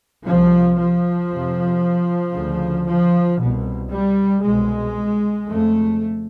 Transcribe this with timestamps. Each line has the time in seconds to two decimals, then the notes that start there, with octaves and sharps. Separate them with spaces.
0.26 C2 C3 F3
0.79 F3
1.30 F2 C3
2.34 D2 C#3
2.87 F3
3.39 C2 B2
3.91 G3
4.43 C2 B2 G#3
5.48 F2 C#3 A3